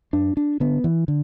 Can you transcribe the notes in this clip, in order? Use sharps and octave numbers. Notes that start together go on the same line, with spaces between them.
F#2 D4
D4
D3 B3
E3
D3